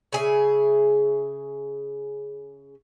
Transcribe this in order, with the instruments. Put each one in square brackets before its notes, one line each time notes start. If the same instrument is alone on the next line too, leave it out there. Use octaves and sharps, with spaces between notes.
[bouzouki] C#3 G#4 E5